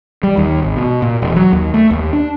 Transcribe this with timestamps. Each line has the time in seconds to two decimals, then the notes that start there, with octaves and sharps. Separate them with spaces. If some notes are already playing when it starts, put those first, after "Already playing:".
0.23 G3
0.37 D#2
0.63 G#1
0.77 B2
1.02 A#2
1.22 E1
1.36 F#3
1.52 D#2
1.74 A3
1.91 D#2
2.13 D4